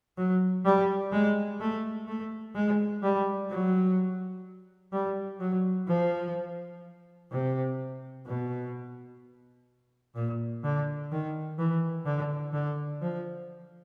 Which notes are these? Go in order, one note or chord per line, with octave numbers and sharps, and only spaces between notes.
F#3
G3
G#3
A3
A3
G#3
G3
F#3
G3
F#3
F3
C3
B2
A#2
D3
D#3
E3
D3
D3
F3